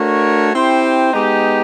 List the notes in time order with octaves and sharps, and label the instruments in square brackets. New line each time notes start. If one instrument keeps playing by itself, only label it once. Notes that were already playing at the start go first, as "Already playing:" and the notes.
Already playing: [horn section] A3 D4 F#4 A#4 C#5
C4 E4 G4 C5
G#3 B3 D#4 G4